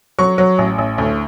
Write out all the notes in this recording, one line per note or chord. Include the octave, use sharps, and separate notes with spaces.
F#3 C#6
F#3
A1
A1
D2